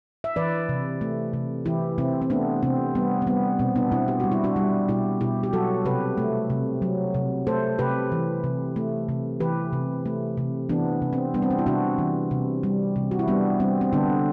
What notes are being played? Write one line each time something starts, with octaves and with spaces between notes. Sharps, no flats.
E5
E3 B4 D5
C3
A3
C3
E3 E4 G4
C3 C4 E4
C4
A3 B3 D4
C3 C4
G3 B3
C4
G3 B3
B2 C4
B3 D4
B2 C4 E4
G4
G3 F#4
E4
D4 F#4
G3
B2 E4 G4
B2 E4 G4
G4
F#3 F#4 A4
C3 G4 B4
A3
C3
F#3
C3
A3 A4 C5
C3 G4 B4
E3
C3
A3
C3
E3 G4 B4
C3
A3
C3
E3 B3 D4
C3
C4
G3 B3 D4
C4
D4
E4
C3 D4 F#4
E3
C3
G3
C3
F#4
E4
G3 B3 D4
G3 C4
C4
D3 B3 D4